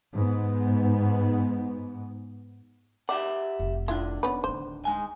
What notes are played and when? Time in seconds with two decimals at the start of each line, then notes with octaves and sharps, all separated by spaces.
0.13 G#2 B3
3.09 G4 D5 E5 F#5
3.59 F1 A#2
3.88 D#3 D4 E4 F4
4.23 B3 C#4 B4
4.44 D1 D3 C5
4.85 G#2 G#3 G#5